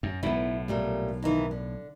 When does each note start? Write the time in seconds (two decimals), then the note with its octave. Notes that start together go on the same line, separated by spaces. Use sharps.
0.03 F#2
0.23 B1 A2 B3 E4
0.68 A#2 G3 A3
1.23 D#2 D#3 E3
1.51 D3